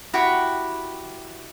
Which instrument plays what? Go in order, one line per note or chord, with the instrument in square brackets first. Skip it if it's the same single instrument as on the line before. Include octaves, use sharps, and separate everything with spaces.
[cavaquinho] E4 F#4 G4 G5